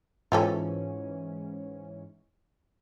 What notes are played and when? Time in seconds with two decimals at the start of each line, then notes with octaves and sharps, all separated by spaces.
0.32 G#2 E3 C#4 F4 G4 A4